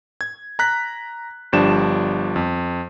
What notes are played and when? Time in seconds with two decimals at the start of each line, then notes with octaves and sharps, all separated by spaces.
0.21 G#6
0.59 A#5 F#6 B6
1.53 G1 F3 G3 D4 E7
2.36 F2